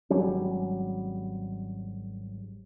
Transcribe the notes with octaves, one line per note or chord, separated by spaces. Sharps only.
G#1 F#3 G3 C#4